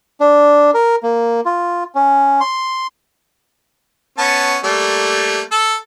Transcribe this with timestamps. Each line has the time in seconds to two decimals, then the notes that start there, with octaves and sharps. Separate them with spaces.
0.20 D4
0.74 A#4
1.03 A#3
1.45 F4
1.95 C#4
2.40 C6
4.18 B3 C#4 A5
4.64 G3 A3 A#3
5.52 A4